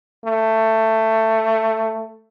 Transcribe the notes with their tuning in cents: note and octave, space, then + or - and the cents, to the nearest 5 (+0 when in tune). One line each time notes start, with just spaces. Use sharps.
A3 +15